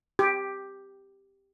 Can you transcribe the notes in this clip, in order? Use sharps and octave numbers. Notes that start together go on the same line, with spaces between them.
G4